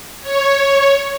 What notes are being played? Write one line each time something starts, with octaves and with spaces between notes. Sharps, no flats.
C#5